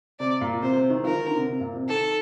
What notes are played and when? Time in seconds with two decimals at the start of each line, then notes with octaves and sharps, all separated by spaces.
0.19 C3 D5
0.41 A#2
0.62 C3 C5
0.76 C3
0.90 D#3
1.04 F3 A#4
1.15 D#3
1.26 D3
1.36 C3
1.47 C3
1.60 A#2
1.75 C3
1.89 D#3 A4